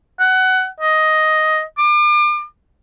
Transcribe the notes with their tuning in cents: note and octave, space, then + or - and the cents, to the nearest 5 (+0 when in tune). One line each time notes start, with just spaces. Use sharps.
F#5 +20
D#5 +5
D6 +35